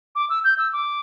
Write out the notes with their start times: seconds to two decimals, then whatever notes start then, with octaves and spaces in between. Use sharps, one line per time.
0.15 D6
0.30 E6
0.44 G6
0.58 E6
0.73 D6